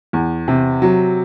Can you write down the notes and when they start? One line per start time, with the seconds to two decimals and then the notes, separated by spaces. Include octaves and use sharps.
0.13 E2
0.48 C3
0.82 F#3